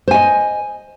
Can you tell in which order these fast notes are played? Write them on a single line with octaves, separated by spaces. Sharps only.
C5 G#5 D#5